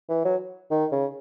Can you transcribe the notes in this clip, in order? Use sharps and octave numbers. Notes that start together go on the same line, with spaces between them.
E3
F#3
D#3
C#3